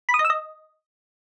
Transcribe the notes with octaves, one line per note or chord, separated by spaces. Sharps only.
B5
D#6
D#5
E6
D#5